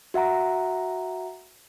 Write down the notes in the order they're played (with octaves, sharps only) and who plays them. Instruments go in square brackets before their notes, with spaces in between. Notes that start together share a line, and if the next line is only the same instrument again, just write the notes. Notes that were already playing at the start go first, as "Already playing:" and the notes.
[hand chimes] F#4 E5 F#5 A#5